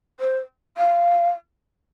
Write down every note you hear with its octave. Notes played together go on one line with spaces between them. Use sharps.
C5
F5